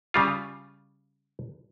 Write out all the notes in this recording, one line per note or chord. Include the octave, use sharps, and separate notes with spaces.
C#3 G3 F4